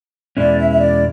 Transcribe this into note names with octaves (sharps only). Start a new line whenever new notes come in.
E2 B2 G#3 C#4 E4 D5
E5
E5
D5